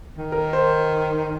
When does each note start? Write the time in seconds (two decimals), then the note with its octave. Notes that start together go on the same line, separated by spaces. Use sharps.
0.18 D#3
0.32 A#4
0.53 C5